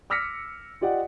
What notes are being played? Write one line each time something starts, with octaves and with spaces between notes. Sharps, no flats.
D6 E6 F6 A#6 B6 C#7
F4 G4 D5 D#5 F#5